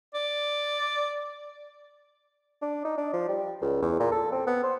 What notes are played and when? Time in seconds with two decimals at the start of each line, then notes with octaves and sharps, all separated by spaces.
0.14 D5
2.62 D4
2.85 D#4
2.98 D4
3.13 F3
3.28 G3
3.62 C#2
3.82 E2
4.00 A#2
4.12 A4
4.32 C4
4.47 B3
4.63 C5